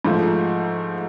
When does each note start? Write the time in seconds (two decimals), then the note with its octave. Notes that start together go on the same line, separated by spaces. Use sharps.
0.05 G#2 F3 A3